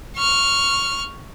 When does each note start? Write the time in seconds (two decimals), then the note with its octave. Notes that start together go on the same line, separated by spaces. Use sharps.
0.17 C#6 F6